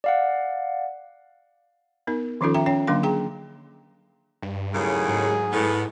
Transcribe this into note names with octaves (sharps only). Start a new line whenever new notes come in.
D5 F5 F#5
B3 D#4 A#4
D#3 F3 C#4 D#4 F4 A4
E5 G5 A#5
C#4 C#5 G5
D3 F#3 A#3 D4 F5 C6
G#4 G5 A#5
G2
D#2 A2 C#3 F#3 G#4
G#2
A2 B3